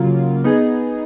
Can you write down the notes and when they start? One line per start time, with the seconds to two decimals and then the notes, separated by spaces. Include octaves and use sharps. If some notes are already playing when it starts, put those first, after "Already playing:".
Already playing: C#3 F#3 A#3 F4
0.44 B3 D#4 G#4